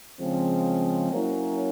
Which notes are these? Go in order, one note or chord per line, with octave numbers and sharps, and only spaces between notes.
C#3 F3 G#3 C4
F#3 A#3 C#4 E4